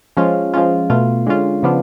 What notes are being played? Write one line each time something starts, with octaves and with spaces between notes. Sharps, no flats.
F3 G#3 C#4 F4
F3 G#3 C#4 F4
B2 A3 F4
D3 G#3 C#4 F4
C#3 F3 B3 D4 F4